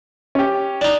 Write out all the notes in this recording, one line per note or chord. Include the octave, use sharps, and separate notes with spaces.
C#4 G4
D4 D#4